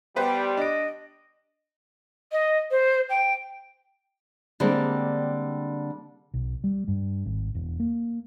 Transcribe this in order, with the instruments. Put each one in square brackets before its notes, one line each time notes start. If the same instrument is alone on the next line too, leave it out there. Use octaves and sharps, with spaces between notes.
[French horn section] G3 [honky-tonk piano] B3 B4 C5 [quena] G5
[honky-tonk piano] D4 D7 [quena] D#5
[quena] D#5
C5
G5
[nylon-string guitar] D3 G3 G#3 A#3 C4
[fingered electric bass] B1
G3
G2
G#1
E1
A#3